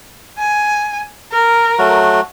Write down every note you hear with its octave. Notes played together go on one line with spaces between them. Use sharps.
G#5
A#4
F#3 A3 F#4